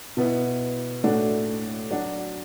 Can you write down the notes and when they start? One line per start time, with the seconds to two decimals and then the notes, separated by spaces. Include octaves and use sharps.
0.17 B2 B3 E4
1.04 A2 A3 D4 F#4
1.91 F#3 D4 F#4